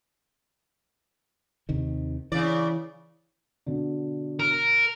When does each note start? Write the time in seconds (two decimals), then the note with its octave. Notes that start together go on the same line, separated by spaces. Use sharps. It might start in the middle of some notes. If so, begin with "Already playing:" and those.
1.69 D#2 C3 D#3
2.32 C#3 E3 D5
3.66 B2 D3
4.40 A#4